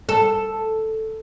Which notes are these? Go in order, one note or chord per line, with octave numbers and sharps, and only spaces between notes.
A4